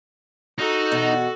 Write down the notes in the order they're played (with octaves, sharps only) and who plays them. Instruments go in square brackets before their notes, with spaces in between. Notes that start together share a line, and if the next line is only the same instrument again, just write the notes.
[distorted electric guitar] D#4 [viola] F#4 A4
[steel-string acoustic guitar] E2 B2